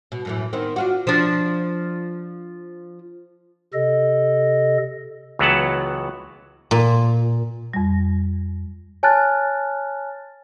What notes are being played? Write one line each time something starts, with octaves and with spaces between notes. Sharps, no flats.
B2
F#2 A2 E3
D#3 B3 C4
D4 F4 F#4
F3 D4
C3 A4 D#5
C#2 E3 F#3 B3 F#5 A5
A#2
F2 G3
C#5 G#5 A5 F6 F#6 A6